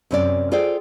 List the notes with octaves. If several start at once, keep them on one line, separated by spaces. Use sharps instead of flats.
F#2 C3 C4 C#4 D5
F4 G#4 A4 C5 D5 G5